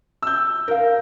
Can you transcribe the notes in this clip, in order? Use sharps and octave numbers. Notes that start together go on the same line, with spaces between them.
E6 G6
A#4 F5